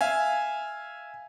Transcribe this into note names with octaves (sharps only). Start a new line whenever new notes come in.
E5 F5 G#5